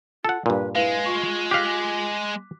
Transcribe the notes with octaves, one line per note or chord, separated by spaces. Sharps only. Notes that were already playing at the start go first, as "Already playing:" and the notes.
F4 A4 F#5
G2 A#2 B4
G#3 E4 B4 F5
F4 C#6
G4 F5 D6 F#6 B6